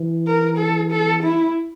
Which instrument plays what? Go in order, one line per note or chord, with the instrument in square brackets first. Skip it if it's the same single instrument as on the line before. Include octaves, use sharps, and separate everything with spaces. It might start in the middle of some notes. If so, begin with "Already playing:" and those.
Already playing: [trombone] E3
[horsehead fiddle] A#4
A4
A4
E4